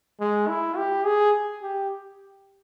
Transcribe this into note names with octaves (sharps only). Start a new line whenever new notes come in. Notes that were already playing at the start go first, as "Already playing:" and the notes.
G#3
E4
G4
G#4
G4